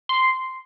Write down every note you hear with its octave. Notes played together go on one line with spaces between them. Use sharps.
C6